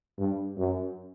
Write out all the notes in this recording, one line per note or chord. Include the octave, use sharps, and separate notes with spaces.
G2
F#2